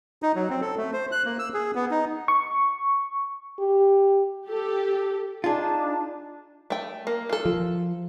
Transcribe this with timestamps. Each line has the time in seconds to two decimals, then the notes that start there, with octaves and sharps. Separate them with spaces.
0.23 D#4
0.35 F#3
0.50 C4
0.62 A4
0.77 A3
0.93 C5
1.12 F#6
1.26 A#3
1.39 E6
1.54 G#4
1.75 B3
1.91 D#4
2.28 C#6
3.59 G4
4.48 G4 A4
5.44 D4 D#4 F4 G#4 A5
6.70 A3 G5
7.07 A#3
7.29 F4 A4
7.45 F3